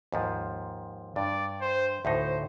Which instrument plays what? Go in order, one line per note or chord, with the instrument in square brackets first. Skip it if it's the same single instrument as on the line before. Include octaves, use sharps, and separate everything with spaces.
[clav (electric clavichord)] D#2 G#2 F3
[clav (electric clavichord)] G2 [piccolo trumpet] D5
[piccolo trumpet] C5
[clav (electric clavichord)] D2 A2 D#4 [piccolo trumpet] C5